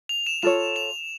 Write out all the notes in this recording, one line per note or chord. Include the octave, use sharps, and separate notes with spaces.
F7
E7
F4 A4 C#5 E7
F7